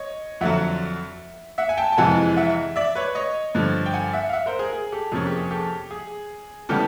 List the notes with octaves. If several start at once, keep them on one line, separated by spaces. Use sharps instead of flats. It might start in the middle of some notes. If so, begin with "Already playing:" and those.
Already playing: C#5 D#5
F2 D3 F#3 E5 F#5
E5 F#5
G#5
G5 A5
A5
F2 C3 E3 G#3 F#5 G#5
E5 F#5
D5 E5
B4 C#5
C#5 D#5
G2 D3 F3
G5
F#5 G#5
E5 F#5
F5
E5 F#5
A#4 C5
G#4 A#4
G#4
G4 A4
F2 C3 F3 A#3 C#4 G#4
G4
G#4
G4 A4
G#4
C#3 E3 G3 B3 G4 A4